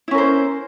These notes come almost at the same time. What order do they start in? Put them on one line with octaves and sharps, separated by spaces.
E4 C#4 A#4 C5